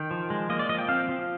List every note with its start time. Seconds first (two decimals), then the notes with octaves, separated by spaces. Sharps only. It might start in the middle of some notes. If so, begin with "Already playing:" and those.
Already playing: D#3 G5
0.11 F3
0.30 G#3
0.49 A#3 D#5
0.59 D5
0.69 F3 D#5
0.79 G5
0.89 C4 F5
1.09 F3